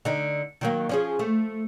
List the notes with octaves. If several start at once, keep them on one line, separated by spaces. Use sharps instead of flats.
D3 D#4
D#3 F#3 A#3
F3 C#4 G#4
A3